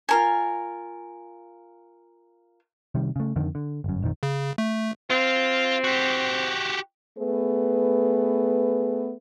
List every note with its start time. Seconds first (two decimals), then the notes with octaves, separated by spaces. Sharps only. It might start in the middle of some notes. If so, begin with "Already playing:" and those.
0.09 F4 A#4 G#5
2.95 C3 D#3 G3
3.16 C#3 A3
3.36 F2 D3 D#3
3.55 D3
3.84 G1 F#2
4.02 A#1 F2 D#3
4.23 C#3
4.58 A3
5.10 C4 F4 F5
5.84 F#4 G4
7.18 A3 B3 G#4 B4